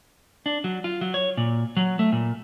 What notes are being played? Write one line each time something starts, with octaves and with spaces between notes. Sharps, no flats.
D4
F#3
F4
F#3
C#5
A#2
F#3
A3
A#2